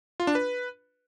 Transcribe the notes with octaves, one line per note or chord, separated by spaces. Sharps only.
F4
D4
B4